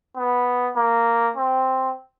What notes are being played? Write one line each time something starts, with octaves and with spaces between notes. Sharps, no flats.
B3
A#3
C4